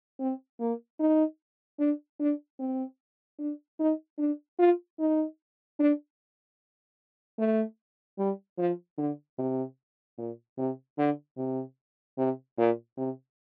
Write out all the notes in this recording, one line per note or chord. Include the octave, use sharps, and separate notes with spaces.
C4
A#3
D#4
D4
D4
C4
D4
D#4
D4
F4
D#4
D4
A3
G3
F3
D3
C3
A#2
C3
D3
C3
C3
A#2
C3